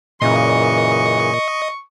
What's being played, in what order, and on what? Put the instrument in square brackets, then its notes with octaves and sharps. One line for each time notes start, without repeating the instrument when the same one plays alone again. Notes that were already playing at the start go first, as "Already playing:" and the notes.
[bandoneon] F#2 C#3 E3 [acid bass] A#2 [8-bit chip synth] D#5 [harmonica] C#6